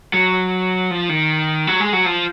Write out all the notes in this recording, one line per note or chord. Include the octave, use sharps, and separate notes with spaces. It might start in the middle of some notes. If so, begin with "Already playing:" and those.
F#3
F3
D#3
F#3
G#3
F#3
F3